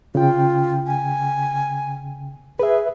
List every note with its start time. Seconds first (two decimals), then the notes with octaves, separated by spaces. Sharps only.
0.15 C#3 F4 G5
0.87 G#5
2.59 G#4 B4 E5